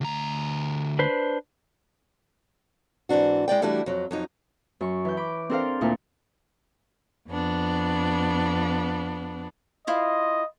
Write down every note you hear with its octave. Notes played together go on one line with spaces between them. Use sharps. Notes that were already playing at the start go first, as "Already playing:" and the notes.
D2 A#5
D4 B4 C5
G#2 E3 C4 D4 F#4
G#3 E4 D5 G5
E3 G3 A3 D4 E4 F#4
F2 F#3
F2 F#3 D#4
F#2 C#6
E3 G6
B5 D6
C4 D4 A4 A#4 C5 F5
D2 A#2 E4 A4 A#4
F2 B3 D4
E4 F4 C5 D#5